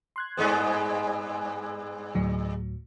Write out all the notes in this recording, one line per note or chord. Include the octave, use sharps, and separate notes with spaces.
C6 F#6 G#6
G2 G#3 B3
D2 A2 F#3